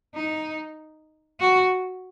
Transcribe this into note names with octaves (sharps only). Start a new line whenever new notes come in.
D#4
F#4